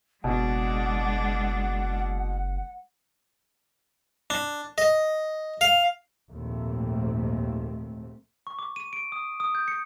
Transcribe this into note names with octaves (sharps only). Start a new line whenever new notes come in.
F#1 B2 G#3 D4 F#5
D4
D#5
F5
A#1 D#2 G#2 A3 C4
C#6
D6
D#7
D7
D#6
D#6
G6
C#7